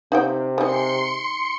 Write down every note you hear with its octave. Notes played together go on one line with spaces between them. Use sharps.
C3 D#4 F#5 G5
D#3 G#3 C6 C#7